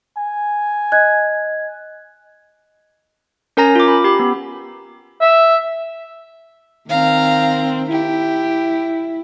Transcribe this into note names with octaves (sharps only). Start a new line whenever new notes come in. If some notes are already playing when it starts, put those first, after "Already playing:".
G#5
D#5 F#6 G#6
C#4 A#4 G#5 A#5 A#6
F4 D6
B5
G4 B5
B3
E5
D#3 C4 F5 A#5
E4 G4